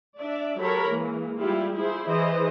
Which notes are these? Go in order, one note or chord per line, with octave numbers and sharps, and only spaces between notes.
D4 D5 E5
F#3 G4 A4 A#4 C#5 B5
E3 G#3 A#3
G3 G#3 E4 F4 G4
E4 F4 G#4 C5
E3 G#4 C5 D#5